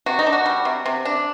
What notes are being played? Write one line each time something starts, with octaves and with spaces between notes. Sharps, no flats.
C3 F#4
D#4
D4
F#4
G3
C3
C3
D4